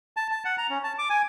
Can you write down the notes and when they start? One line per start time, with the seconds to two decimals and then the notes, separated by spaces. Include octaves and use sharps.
0.17 A5
0.31 A5
0.45 F#5
0.58 A#5
0.70 C#4
0.84 A5
0.98 D6
1.10 G#5